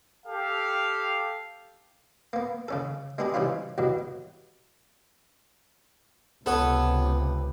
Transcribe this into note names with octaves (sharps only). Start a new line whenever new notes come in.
G4 A4 F5
A#3 B3
C#3 C#4 A4
G#3 B3 D4 G4 G#4
C3 E3 G3 C#4 D#4 F4
C2 G2 B2 F#3
C#2 C3 B3 A4 B4 C#5